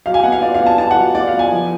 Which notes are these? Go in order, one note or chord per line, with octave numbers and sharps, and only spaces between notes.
F#3 F5
G#5
B3 F#5
F5
F4 D5
F5
B3
A5
F4 A5
F#5
F#3
F4 D5
F5
B3
G#5
F3